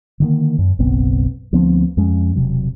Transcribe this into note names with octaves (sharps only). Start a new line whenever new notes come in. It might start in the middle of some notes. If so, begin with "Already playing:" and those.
D3 D#3 A#3
F#2
F#1 B1 B3 C4
D2 F3 B3 C4
F2 G#3 C#4
E1 C3 F#3